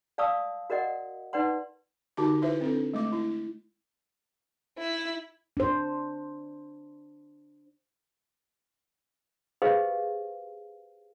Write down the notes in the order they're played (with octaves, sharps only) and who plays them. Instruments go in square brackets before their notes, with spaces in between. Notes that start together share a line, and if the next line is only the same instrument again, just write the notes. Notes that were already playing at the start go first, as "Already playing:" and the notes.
[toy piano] D5 F5 A5 C#6 D#6 E6
F#4 A#4 D5 D#5 F#5
D#4 B4 D5 F#5 C6
[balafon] D3 D#4 F#4 G4 D6
E4 B4 C5 E5
C4 D4 A4
G#3 A3 D6
E4
[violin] E4
[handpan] D4 C5
[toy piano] G4 G#4 B4 C5 D#5 F5